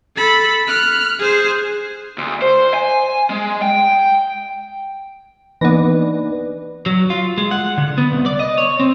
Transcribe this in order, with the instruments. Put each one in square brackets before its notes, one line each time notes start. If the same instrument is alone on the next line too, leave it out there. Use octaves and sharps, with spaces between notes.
[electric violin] A4 B5
F6 F#6
G#4 C5
[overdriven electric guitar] D2
C5
G#5
G#3
G5
[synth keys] E3 [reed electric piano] A#3 D4 D#4 [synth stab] B3 A#6 [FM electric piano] B4 D5
[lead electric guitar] F#3
F4
G#3
F#5
D3
B3
C2
D5
D#5
C#5
C4